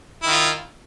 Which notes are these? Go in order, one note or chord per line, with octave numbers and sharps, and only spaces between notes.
D#3 E4 F4